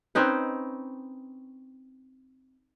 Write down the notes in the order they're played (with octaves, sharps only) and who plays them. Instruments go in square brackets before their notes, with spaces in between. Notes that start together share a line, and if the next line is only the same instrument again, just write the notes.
[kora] C4 C#4 D#4 B4